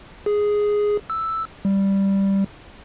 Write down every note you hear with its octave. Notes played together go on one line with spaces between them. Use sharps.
G#4
E6
G3